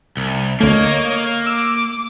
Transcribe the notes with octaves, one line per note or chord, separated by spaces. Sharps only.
C2
D2 A3 A#3 C#5 D#5
D6 E6